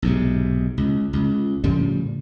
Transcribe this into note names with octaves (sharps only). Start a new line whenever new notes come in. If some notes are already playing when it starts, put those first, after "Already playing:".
B1 G#2 C3
C#2
C#2
A2 C#3 F3 G3